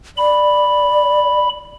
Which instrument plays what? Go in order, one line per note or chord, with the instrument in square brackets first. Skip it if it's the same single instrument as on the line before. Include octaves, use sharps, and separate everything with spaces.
[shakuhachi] D5 [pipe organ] B5